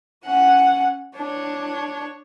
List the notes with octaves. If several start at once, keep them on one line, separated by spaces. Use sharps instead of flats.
C#4 F#5
D4 C#5